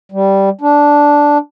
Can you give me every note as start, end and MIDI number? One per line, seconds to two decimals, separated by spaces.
0.12 0.49 55
0.61 1.38 62